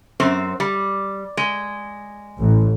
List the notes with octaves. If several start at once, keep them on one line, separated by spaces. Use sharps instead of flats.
F#2 C4 C5
G3
G#3
A1